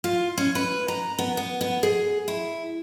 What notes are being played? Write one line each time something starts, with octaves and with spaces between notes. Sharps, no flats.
F4
C#4
B4
A#5
B3
B3
B3
G#4
E4